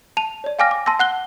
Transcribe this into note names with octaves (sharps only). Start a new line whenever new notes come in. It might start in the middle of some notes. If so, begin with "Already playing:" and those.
A5 D#7 F7
C#5 D5
F5 G5 G#5 D6 F6 A#6
D6
A5 C6 E6 A#6
F#5 F#6 G7